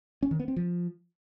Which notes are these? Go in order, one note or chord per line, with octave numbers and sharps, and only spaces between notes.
C#4
D#3
B3
C4
F3